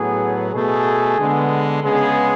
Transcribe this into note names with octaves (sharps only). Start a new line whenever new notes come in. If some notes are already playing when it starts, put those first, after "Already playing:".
Already playing: A2 F#3 B3 G#4
B2 A3 G#4
D3 G#3 B3
C#3 G#3 B3 G#4